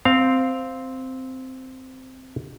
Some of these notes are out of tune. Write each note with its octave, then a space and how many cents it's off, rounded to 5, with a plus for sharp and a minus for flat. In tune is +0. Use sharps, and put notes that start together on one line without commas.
C4 -5 F5 +0